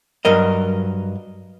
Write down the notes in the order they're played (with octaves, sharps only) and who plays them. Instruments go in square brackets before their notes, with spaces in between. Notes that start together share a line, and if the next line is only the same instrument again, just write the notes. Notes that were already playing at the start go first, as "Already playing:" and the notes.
[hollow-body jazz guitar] G2 F#3 A#4 D#5